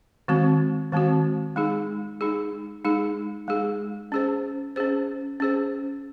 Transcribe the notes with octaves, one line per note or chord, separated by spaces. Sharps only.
D#3 G#3 C4 F#4
D#3 G#3 C4 F#4
G#3 D#4 G#4
G#3 D#4 G#4
G#3 D#4 G#4
G#3 D#4 G#4
C#4 G#4 C5
C#4 G#4 C5
C#4 G#4 C5